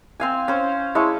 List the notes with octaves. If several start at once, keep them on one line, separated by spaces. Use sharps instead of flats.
C4 F5 G#5
C#4 C5
G#3 E4 C#5 A5